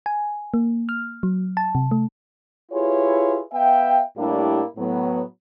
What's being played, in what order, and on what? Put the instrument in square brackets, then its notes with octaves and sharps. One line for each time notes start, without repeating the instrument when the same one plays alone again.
[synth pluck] G#5
A#3
F6
F#3
A5
C3
A3
[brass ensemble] E4 F4 G4 G#4 B4 C#5
B3 E5 F5 G5
A2 G3 A#3 D4 E4 G4
A2 F#3 B3